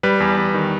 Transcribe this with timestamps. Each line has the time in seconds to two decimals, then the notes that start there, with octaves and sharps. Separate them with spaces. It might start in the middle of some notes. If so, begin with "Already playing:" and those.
0.03 G3 B4
0.20 E2
0.37 E2
0.54 D#3